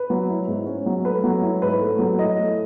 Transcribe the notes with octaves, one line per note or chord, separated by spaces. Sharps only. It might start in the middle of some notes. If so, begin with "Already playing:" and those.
Already playing: B4
F#3
E4
G#2
C#4
F#3
A3 B4
F#3
E4
G#2 B4
A3
F#3
E4 D#5
A3